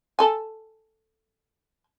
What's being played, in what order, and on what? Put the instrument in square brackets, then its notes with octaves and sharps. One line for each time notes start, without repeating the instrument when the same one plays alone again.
[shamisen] A4 G#5